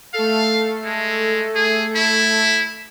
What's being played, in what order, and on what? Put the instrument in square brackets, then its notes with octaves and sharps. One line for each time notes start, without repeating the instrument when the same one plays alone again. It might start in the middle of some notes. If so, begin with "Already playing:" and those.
[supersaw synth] A3 A4 [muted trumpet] F5
[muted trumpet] G#3
G#4
E4